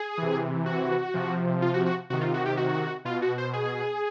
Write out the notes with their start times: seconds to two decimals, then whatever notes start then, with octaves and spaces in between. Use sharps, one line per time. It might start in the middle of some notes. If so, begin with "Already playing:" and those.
Already playing: G#4
0.18 C3 E3
0.66 F#4
1.14 C3 F3
1.62 F4
1.74 F#4
1.86 F#4
2.10 C3 D#3 F#4
2.21 F4
2.34 F#4
2.45 G4
2.57 F#4
3.05 B2 F4
3.22 F#4
3.38 C5
3.53 G#4